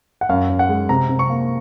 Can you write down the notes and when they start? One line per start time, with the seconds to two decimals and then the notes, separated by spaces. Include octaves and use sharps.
0.21 F#5
0.29 F#2 F5
0.49 F#2
0.59 F#5
0.69 G#3
0.89 C3 A#5
1.09 C3
1.19 C#6
1.29 A#3